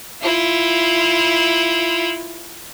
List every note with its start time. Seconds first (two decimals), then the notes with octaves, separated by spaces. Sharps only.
0.22 E4 F4